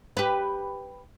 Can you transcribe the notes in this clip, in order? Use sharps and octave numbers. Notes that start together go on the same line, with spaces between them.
G4 B4